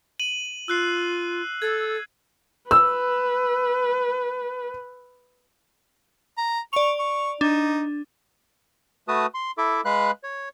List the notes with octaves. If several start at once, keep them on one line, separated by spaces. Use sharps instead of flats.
D#7 F#7
F4 E6 F#6 C7
A4 G#6
B4 E6
A#5
D5 C#6 F7
C#6
D4 D#4
A3 F#4 B4 A5 D#6
C6
E4 A4 E5 D6
G#3 B4 F5 B5 F#6
C#5